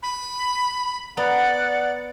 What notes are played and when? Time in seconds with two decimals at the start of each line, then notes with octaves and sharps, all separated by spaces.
0.03 B5
1.17 B3 D5 F#5 A#5